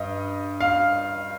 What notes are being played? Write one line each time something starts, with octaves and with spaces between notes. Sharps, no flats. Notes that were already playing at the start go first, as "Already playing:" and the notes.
Already playing: G2 D#5
F5